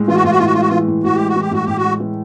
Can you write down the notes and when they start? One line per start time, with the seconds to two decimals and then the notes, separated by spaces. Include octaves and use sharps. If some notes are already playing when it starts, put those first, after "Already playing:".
Already playing: A2 G#3
0.08 E3 F4
0.15 F#4
0.23 A2 F4
0.31 F#4
0.38 A2 F4
0.46 F#4
0.53 F4
0.56 G#3 F#4
0.68 E3 F4
0.88 A2
1.04 A2 F#4
1.16 G#3 G4
1.28 F#4
1.36 E3 G4
1.51 A2 F#4
1.65 A2 G4
1.77 F#4
1.83 G#3
2.00 E3